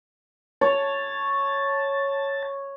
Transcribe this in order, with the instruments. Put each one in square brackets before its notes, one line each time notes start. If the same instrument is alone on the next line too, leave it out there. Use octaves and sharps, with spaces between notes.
[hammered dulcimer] C#5 [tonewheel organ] A5